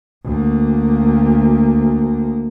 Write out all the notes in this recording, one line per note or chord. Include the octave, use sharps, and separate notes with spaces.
D2 A#3